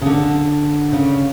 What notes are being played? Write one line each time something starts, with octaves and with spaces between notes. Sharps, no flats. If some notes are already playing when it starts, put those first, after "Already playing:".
C#3
D3
C#3